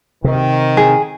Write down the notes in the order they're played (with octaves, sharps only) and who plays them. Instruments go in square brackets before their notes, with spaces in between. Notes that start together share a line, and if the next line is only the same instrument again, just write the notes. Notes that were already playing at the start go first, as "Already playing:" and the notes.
[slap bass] C3 [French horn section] D#3
[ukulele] G#4